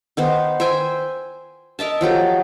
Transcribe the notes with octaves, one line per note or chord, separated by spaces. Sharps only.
D#3 B3 C5
C5 E5 G5 G#5
A#4 D#5 E5 A5
F3 F#3 G4 A4